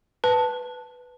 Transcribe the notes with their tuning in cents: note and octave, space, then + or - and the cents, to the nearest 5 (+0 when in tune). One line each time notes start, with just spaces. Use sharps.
B4 +0 A5 +0